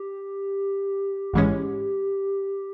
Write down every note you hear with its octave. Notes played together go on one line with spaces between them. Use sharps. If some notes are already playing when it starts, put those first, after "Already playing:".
Already playing: G4
A1 G#2 E3 G#3 C#4